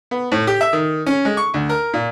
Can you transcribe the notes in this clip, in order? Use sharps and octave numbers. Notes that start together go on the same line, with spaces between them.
B3
A2
G4
E5
D#3
C#4
G#3
C#6
D2
A#4
A#2